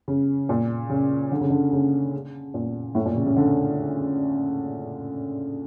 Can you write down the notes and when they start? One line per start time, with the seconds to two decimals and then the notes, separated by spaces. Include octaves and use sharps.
0.08 C#3
0.49 A#2
0.90 C#3
1.32 D3
1.41 C#3
1.50 D3
1.73 C#3
2.54 A#2
2.95 A2
3.06 A#2
3.16 C#3
3.26 C#3
3.37 D3